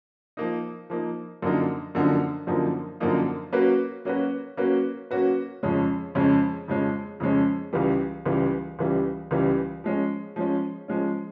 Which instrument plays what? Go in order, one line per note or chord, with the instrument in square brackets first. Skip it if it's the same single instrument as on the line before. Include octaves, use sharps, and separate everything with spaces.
[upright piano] F3 A#3 D#4
F3 A#3 D#4
F#2 D3 F3 A#3 D#4
F#2 D3 F3 A#3 D#4
F#2 D3 F3 A#3 D#4
F#2 D3 F3 A#3 D#4
F#3 A#3 C#4 F#4 B4
F#3 A#3 C#4 F#4 B4
F#3 A#3 C#4 F#4 B4
F#3 A#3 C#4 F#4 B4
F2 C#3 F3 G#3 C#4
F2 C#3 F3 G#3 C#4
F2 C#3 F3 G#3 C#4
F2 C#3 F3 G#3 C#4
C#2 C#3 E3 G3
C#2 C#3 E3 G3
C#2 C#3 E3 G3
C#2 C#3 E3 G3
F3 G#3 C#4
F3 G#3 C#4
F3 G#3 C#4